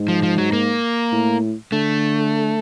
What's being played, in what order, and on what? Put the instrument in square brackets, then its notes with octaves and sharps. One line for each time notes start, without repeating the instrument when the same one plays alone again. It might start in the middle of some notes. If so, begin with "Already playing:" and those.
Already playing: [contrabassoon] G#2
[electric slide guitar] F3
F3
F#3
A#3
[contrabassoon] A2
[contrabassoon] D3 [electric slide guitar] A3